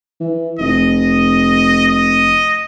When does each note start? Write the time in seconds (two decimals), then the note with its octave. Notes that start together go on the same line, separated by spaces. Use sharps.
0.20 E3
0.59 F1 D#5
1.89 D#5